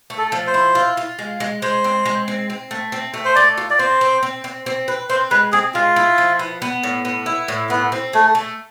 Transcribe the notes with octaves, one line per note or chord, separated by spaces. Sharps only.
A3
A4
F3
C5
E4
F4
F4
G#3
G#3
G#3 C5
C4
G#3
C4
C4
A3
C4
A3
C5
A3 D5
F4
D5
C4 C5
C4
C4
C4
C4
B4
C4 C5
G#3 B4
C4 G#4
G#3 F4
E4
F3
B3
B3
A2
B3
E4
A2
A3 B3
C4
A3 G#4
A3